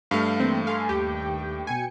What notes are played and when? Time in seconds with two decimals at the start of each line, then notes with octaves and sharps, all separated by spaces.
0.11 G2 A3 F5
0.40 E3 A#3 C4
0.67 A4 F5 G#5 C6
0.89 D#2 G4 G5
1.67 B2 G5 G#5 C#7